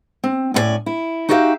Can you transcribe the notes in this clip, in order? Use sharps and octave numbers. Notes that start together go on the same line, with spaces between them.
C4
A2 C#4 E4 D5 G#5
E4
D#4 F#4 G4 D5 E5 F5